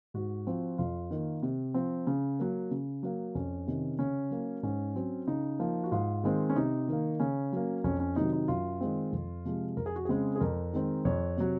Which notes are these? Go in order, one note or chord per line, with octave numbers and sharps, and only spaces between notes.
G#2 F#4
F3 C4
F2 F4
D#3 A#3
C3
F3 C4
C#3
F#3 A#3
C#3
F#3 A#3
F2 C#4
C3 D#3
C#3 C#4
F#3 A#3
G#2 C#4
F#3 C4
C#3 D#4
F3 A#3
F#4
G#2 F4
D#3 G#3 C4
C#4
C3 D#4
D#3 A#3
C#3 C#4
F#3 A#3
F2 C#4
C#4
C3 D#3 F#3 D#4
D#4
F#2 F4
D#3 G#3 C4
F2
C3 F3 G#3
F2 A#4
G#4
F#4
C#3 G#3 C4 G#4
G#4
F2 A#4
D#3 G#3 C4
F2 C#5
C3 F#3